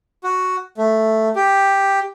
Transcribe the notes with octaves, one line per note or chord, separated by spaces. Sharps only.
F#4
A3
G4